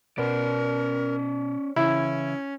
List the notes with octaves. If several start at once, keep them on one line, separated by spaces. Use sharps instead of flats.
B2 B3 C#4 A#4 D5
C#3 E3 C#4 E4